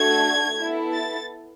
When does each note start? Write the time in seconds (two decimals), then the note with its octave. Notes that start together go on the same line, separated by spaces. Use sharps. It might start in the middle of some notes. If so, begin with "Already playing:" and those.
Already playing: A3 D4 F#4 A4 G#6
0.59 B3 E4 A4
0.94 A6